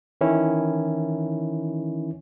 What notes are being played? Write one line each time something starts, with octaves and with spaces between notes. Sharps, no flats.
D#3 E3 C#4 E4